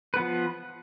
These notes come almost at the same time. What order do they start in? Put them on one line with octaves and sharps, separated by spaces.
B4 B3 F3